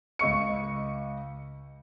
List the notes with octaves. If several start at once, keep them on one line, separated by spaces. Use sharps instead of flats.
C#2 D#5 C#6 C#7